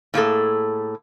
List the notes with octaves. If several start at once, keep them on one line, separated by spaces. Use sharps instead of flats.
A2 A#3 G#4 A4